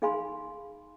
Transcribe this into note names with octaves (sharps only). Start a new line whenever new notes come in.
D#4 G#4 F5 G#5 B5 C6